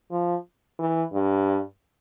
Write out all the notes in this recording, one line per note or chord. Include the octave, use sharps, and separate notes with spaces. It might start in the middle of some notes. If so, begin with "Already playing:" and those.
F3
E3
G2